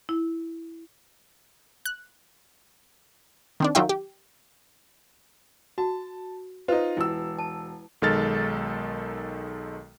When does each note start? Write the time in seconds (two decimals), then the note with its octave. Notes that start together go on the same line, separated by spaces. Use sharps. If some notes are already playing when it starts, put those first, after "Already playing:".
0.09 E4
1.85 F#6
3.60 D#3 C4 D4
3.75 D#3 F#3 D#4 F4 E5 G5
3.89 G4
5.78 F#4 A5
6.68 D#4 F4 B4 C5
6.97 E1 E4 E6
7.38 A5
8.02 B1 D#3 G#3 A4 F6 A6